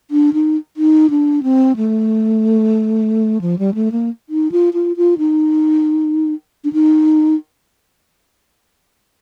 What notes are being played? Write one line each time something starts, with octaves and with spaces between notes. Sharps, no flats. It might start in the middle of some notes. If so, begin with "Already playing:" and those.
D4
D#4
D#4
D4
C4
A3
F3
G3
A3
A#3
D#4
F4
F4
F4
D#4
D4
D#4